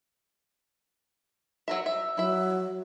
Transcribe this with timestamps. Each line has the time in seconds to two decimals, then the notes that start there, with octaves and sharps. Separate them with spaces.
1.68 F#3 A#4 E5
1.86 E5
2.17 F#3 E4 E5